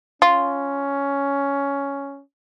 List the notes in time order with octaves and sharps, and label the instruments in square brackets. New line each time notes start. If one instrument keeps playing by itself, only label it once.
[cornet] C#4 [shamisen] F4